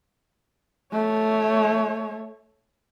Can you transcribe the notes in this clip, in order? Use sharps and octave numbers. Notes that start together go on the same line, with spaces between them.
A3 C#5